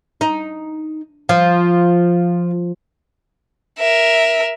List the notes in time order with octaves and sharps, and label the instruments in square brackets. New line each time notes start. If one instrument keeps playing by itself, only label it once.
[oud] D#4
F3
[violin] A#4 E5